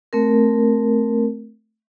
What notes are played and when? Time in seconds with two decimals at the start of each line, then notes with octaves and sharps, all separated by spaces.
0.13 A3 C4 A#4